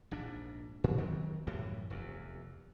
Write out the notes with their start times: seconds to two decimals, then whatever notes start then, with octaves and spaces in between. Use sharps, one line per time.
0.11 A#1 G#2 D4
0.84 A2
0.98 D#3 F#3 C4
1.47 F#2 A2 E3 G3
1.90 F1 E2